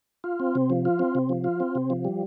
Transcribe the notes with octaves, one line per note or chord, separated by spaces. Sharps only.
F4
C4
C3
F3
F4
C4
C3
F3
F4
C4
C3
F3
G3